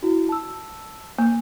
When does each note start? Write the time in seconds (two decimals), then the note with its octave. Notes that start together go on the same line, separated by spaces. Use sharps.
0.03 E4 F#4
0.29 A5 E6
1.19 A#3